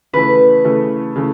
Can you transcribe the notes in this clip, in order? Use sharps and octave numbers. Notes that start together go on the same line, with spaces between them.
C#3 E3 A3 B4
C#3 E3 A3
C#3 E3 A3